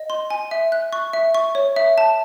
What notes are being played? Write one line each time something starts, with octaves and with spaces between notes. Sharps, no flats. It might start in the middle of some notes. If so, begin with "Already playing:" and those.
Already playing: D#5
C6
G#5
E5
F#6
C#6
E5
C#6
C#5
E5
A5